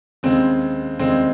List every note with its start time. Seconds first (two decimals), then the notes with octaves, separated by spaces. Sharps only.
0.23 D#2 C#3 G#3 C4 D#4
0.99 D#2 C#3 G#3 C4 D#4